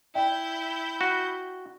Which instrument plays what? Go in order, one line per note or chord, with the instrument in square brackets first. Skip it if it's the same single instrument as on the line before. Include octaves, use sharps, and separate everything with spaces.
[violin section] E4 G6 [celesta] D5 E5 G5
[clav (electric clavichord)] F#4